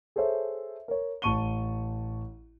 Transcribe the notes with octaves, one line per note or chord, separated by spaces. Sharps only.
G#4 A4 C5 C#5 E5
A#4 C#5
A1 A5 C#6 D#7 G7